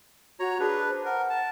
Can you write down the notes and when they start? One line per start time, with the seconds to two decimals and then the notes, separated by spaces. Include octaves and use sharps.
0.40 F#4 C#5 A#5
0.60 D4 G#4 B4
0.89 C5
1.05 A#4 F#5
1.30 A5